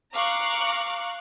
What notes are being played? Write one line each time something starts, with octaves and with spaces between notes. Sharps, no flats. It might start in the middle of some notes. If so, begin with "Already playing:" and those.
F5 A#5 C#6 D6 F#6